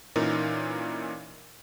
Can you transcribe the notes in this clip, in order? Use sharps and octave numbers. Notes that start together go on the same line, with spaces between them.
A#2 E3 C#4 D#4 A#4